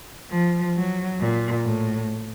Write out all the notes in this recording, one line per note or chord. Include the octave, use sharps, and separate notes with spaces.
F3
F#3
A#2
A2